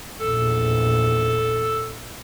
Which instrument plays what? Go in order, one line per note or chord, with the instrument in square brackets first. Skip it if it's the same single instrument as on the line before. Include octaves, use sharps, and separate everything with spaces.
[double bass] A#1 E2 [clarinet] A4